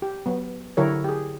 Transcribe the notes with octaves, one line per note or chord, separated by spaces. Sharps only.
G4
F#3 B3
D3 F#3 E4 G4 A#4 C#5
G4 G#4